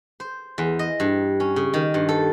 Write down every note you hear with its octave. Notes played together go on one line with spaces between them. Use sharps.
C5
E2
D#5
G2
C#4
C#3
D#3
G2
A4